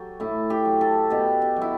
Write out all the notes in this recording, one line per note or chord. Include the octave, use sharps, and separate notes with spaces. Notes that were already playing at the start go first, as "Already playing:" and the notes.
Already playing: F#3 G4 A4
A2 E4
G4
F#3
A4
B2 G4
G4
F#3
E4